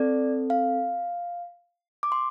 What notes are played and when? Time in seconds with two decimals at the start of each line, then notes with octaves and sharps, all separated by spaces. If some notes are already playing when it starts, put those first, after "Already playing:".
Already playing: C4 A4 D5
0.50 F5
2.03 D6
2.12 C6